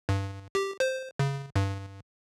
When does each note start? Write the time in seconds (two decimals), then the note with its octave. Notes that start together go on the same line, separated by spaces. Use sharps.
0.09 G2
0.55 G4
0.80 C5
1.19 C#3
1.56 G2